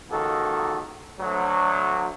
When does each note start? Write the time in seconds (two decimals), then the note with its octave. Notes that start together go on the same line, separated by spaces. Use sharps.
0.10 C#2 D#3 A#3 F#4 A4
1.20 D2 F#3